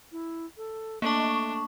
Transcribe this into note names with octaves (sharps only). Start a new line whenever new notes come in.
E4
A4
A3 A#3 D4 C#6